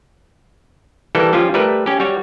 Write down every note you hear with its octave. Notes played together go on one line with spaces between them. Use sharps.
E3 G3 A#3 A4
F3 G3 C#4 F4
G3 A3 A#4 B4
C#4 G4
G3 F#4 C#5